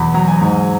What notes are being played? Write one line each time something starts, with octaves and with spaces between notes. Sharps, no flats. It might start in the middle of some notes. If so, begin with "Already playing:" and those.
Already playing: E2 B2 F#3 B5
F#3 A#5
G#5
G#2